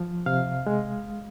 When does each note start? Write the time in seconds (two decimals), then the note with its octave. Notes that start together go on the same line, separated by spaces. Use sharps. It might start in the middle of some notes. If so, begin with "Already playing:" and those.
Already playing: F3
0.26 C3 F5
0.67 G#3